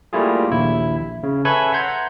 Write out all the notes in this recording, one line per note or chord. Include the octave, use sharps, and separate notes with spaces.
G3 A3 A#3 E4 F4 G#4
A#1 D#2 E4
C#3
A4 B4 C#5 E5 G#5 B5
F#5 A#5 C6 G6 G#6